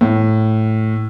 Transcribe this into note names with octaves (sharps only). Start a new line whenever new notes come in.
A2